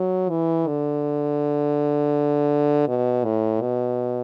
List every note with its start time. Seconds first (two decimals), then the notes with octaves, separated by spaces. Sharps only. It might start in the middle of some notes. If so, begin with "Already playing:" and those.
Already playing: F#3
0.30 E3
0.68 D3
2.88 B2
3.25 A2
3.61 B2